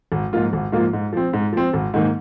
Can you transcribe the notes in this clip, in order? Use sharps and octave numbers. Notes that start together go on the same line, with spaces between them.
G#1
G#2 F3 A#3 F4
G#1
G#2 F3 A#3 F4
G#2
F3 C4
G#2
F3 C4
G#1
G#2 D#3 A#3